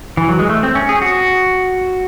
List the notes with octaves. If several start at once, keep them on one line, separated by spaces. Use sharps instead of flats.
E3
F#3
G#3
A3
C4
C#4
G#4
F#4